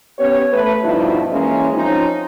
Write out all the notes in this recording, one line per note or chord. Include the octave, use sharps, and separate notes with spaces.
B3 C#4 G4 C#5
A3 B4
G2 B2 F3 D#4 E4
E3 G#3 A#3 C#4
F3 C4 C#4 D#4